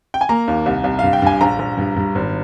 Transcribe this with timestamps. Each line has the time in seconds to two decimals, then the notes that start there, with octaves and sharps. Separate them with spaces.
0.14 G5
0.21 G#5
0.29 A#3 A#5
0.48 D#2
0.66 C2
0.84 C2
0.99 G2 F5
1.13 G5
1.22 G2 G#5
1.41 A#1 A#5
1.59 A#1
1.77 G2
1.96 G2
2.15 G#1